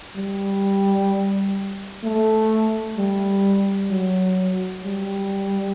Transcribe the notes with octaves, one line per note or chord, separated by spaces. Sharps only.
G3
A3
G3
F#3
G3